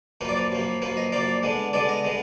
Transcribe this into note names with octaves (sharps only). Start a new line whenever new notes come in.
F#2 F3 A#3 B4
D5
B4
F#2 F3 A#3
F#2 F3 A#3 B4
D#5
F#2 F3 A#3 D5
D3 G#3 B3 D4
D3 G#3 B3 D4 D5
D#5
D3 G#3 B3